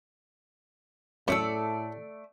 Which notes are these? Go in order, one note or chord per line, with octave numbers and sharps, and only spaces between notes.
F#2 A2 A3 G#4 A4 D5 A5 E6